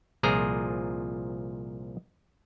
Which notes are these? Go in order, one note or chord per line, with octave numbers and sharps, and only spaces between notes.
C2 A#2 F3 G#4 A#5